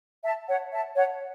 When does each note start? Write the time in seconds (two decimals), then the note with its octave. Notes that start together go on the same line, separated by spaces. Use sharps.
0.23 E5 A5
0.48 C#5 F#5
0.73 E5 A5
0.96 C#5 F#5